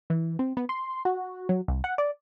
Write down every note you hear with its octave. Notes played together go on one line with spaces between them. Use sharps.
E3
C4
B3
C6
F#4
F#3
C2
F#5
D5